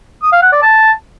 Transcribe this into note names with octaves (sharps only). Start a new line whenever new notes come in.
D#6
F5
F#5
D5
A5